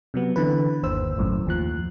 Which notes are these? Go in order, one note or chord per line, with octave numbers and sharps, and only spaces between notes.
C3 F#3 B3
D3 E3 B4
G1 D#2 C5 E6
G1 C2 F#2 A2
D#2 F3 F#6